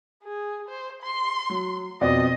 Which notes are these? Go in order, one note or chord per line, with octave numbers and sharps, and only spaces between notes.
G#4
C5
C6
F#3
F2 B2 D5 D#5